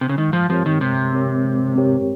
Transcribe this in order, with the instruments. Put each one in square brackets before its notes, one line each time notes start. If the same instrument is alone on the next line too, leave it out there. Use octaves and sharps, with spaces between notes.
[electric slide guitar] C3
C#3
[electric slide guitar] D#3 [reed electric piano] G#3
[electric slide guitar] F3
[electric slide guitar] F3 [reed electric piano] C4 G4 A#4 C#5
[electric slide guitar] D#3
[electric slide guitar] C3 [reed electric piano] G#3
[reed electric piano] C4 G4 A#4 C#5
G#3
C4 G4 A#4 C#5